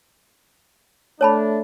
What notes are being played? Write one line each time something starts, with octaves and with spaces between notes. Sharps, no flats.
A3 D4 C#5 A5 B5